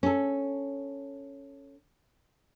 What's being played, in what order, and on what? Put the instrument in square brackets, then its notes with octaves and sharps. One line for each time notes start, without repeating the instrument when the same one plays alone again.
[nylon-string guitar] C#4 A4